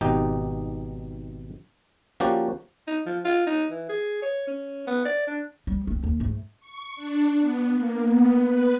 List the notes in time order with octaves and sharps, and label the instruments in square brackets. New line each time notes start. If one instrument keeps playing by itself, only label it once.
[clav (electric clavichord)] G#1 B2 D#4 G4
F3 A#3 C#4 F#4 G4 D5
[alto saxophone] D#4
F3
F4
D#4
E3
G#4
C#5
C#4
B3
D5
D4
[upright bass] G3
A3 C4
D#2
G#2 A3
[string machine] C#6
D4
B3
A#3
B3
B4